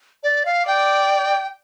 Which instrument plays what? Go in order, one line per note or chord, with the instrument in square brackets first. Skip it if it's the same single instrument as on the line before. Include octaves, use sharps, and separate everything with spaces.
[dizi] D5
F5
[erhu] D5 [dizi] G5